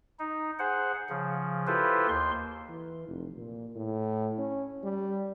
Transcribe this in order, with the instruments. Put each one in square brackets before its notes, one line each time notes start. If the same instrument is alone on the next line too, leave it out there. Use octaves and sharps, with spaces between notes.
[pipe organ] D#4
G#4 C5 F#5
C#3 F3
E4 F4 G4 A4 B4 C5
D#2 C6
[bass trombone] E3
F1
A#2
A2
C#4
G3